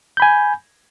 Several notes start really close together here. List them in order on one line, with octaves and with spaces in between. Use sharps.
G6 B5 G#5